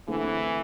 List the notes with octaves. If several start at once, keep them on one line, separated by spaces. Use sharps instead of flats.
D3 E3 A3 C4